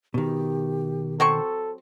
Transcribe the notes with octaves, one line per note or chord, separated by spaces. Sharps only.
B2 D#3 G4
F#3 C4 A4 C#6